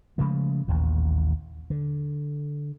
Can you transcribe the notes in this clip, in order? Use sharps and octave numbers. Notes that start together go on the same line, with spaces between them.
C#3 F3 G#3 A3
A1 D#2 A#2
D3